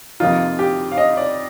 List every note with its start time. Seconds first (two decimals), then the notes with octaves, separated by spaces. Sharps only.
0.20 F2 C3 F3 A#3 D#4 F4
0.59 G4
0.92 F5
0.98 D#5
1.17 D5